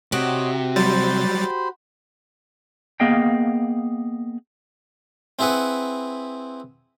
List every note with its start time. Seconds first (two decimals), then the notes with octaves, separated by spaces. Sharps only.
0.12 C3 F#4 G4 C#5 D#5
0.76 F#3 G3 C5 B5 C6 A6
3.00 A#3 B3 G#4 D#5 F5 G5
5.39 C4 E4 G#4 B4 F#5